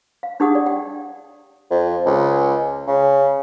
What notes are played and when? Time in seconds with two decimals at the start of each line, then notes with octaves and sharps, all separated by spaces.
0.23 F5
0.40 D4 D#4 G4 G#4 F#5 D#6
0.55 D5
0.66 G5
1.71 F2
2.06 C#2
2.87 C#3